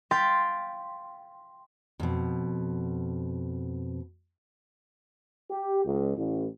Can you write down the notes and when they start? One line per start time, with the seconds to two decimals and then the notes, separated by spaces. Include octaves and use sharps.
0.11 F5 G5 C6 A6 B6
2.00 F2 B2
5.51 G4
5.85 C#2
6.17 A1